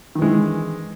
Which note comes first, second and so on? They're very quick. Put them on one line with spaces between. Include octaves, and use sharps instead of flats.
D#3 E3 G#3